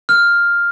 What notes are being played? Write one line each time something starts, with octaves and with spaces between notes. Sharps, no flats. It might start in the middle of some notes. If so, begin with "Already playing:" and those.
F6